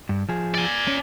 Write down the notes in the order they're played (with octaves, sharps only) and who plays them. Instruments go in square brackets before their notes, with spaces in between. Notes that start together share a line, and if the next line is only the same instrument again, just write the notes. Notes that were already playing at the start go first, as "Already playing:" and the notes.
[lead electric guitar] G2
F3 G#4
[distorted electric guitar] D5 G#5
[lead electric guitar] C#4